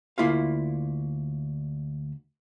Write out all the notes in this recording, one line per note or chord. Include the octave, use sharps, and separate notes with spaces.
D2 A#3 E4 F4 F5